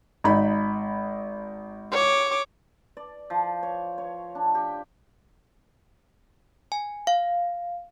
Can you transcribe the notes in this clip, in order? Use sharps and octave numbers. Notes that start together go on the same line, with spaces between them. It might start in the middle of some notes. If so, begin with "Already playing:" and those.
G#1 D#4 B5
C#5 D6
D5
F3
C#5
C#5
D4
G4
G#5
F5